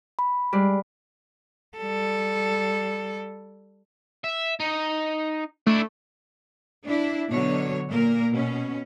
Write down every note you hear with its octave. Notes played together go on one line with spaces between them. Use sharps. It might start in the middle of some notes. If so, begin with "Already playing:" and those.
B5
G3 G#3 D5
G3 A4
E5
D#4
A3 D4 E4
D4 E4
B2 D3 F#3 D4 C#5
A#2 A#3 A#4
B2 C#4